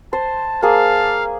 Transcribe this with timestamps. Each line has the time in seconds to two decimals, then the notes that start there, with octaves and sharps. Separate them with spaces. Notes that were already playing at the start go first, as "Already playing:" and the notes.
0.13 C5 A5
0.62 A#3 G#4 F5 A5